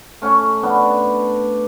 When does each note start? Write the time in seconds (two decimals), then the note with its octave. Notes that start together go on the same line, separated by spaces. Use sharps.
0.22 A3 C#4
0.63 B3 D4